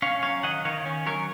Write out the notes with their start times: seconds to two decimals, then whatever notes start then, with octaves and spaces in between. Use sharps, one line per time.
0.02 C#4 C#5 F5
0.23 F#3 C#5 F5
0.43 D#3 D#5 F#5
0.65 D#3 C#5 F5
0.86 C#4
1.06 F#3 A#4 C#5